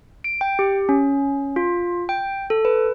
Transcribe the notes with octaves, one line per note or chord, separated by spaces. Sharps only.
D7
G5
G4
C#4
F4
G5
A4
B4